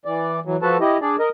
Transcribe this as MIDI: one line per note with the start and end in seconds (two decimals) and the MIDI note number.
0.05 0.40 52
0.05 0.40 74
0.45 0.57 52
0.45 0.57 54
0.62 0.77 53
0.62 0.77 66
0.62 0.77 69
0.62 0.77 71
0.62 0.77 81
0.81 0.98 64
0.81 0.98 67
0.81 0.98 75
1.01 1.16 62
1.01 1.16 68
1.01 1.16 74
1.19 1.29 70
1.19 1.29 75